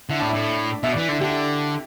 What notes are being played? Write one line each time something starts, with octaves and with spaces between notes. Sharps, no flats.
D3 E4
A2 D4
E4
A2
B2 E5
D5
E3
D3 E4
D3 G4
E4